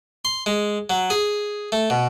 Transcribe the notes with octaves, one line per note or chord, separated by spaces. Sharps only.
C6
G#3
F#3
G#4
A3
B2